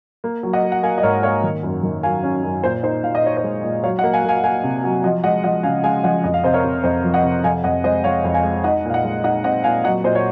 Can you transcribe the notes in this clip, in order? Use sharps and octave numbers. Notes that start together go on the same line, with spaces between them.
A#3
F#3
D#5 F#5
A#3
F#5
A#3 F5 G#5
D#5
G#2 A#4 C#5
A#3 C#5 F5
D#3
F#2
D#3
F#3 F5 G#5
C#4
F#2
A#2 C5
D#4 C5
A#2 F5
D#5
D#4 C#5
C5 D#5
G#3
A#2
F#3 C#5 F5
D#5 F#5
A#3
F5 G#5
A#3 F5 G#5
A#3 F5 G#5
C3
F#3
F3 D#5 F#5
G#3 D#5 F#5
F3 D#5 F#5
C#3 F5 G#5
G#3 F5 G#5
F3 D#5 F#5
F2 D#5
F5
C3 C5 D#5
A#4 C#5
C3
F2 C5 D#5
F3
D#5 F#5
C3
F2 F5 G#5
F2 D#5 F#5
G#3 C5 D#5
F2 C#5 F5
F2
F5 G#5
G#3
D#4 D#5 F#5
A#2
F5
D#5 F#5
G#3
D#4 D#5 F#5
C4 D#5 F#5
A#2 F5 G#5
F#3 D#5 F#5
A#2 C5 D#5
C#5